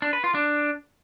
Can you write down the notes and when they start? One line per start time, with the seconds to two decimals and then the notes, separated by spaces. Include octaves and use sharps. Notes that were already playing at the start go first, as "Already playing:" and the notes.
0.02 D4
0.13 B4
0.24 F4
0.35 D4